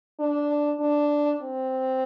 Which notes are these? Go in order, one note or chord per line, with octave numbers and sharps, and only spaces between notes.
D4
D4
C4